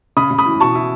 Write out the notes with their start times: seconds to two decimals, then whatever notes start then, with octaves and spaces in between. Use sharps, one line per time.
0.17 C#3 B5 D#6
0.31 C#3
0.38 B5 D#6
0.46 E3
0.60 B2 A5 C#6
0.75 E4